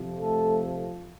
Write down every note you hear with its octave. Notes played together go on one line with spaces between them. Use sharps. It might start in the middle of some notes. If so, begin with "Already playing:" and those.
Already playing: F2 C3 F3
A3 A4